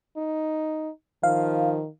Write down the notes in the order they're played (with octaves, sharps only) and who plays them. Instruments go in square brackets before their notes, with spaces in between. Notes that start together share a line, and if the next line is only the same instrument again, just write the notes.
[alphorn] D#4
[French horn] D#3 [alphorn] F3 [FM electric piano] F5